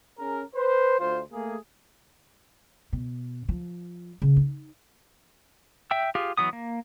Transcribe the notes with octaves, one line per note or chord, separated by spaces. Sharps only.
C#4 G#4 A#4
B4 C5
D2 F4 C5
A3 A#3 G#4
B2
F3
C#3
D#4
E5 G5 E6
F4 G4 G#4 F5
E3 F#3 B3 D#6
A#3